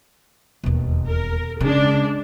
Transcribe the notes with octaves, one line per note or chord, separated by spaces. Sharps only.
E1 D#2
A#4
C#3 G#3 D4